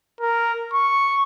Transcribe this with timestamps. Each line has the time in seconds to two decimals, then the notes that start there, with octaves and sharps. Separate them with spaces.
0.21 A#4
0.73 C#6